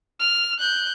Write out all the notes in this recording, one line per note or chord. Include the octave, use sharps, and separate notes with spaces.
F6
F#6 G6